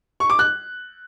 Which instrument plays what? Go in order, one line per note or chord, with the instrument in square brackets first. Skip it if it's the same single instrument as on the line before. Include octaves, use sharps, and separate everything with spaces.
[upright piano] C#6
D6
F#6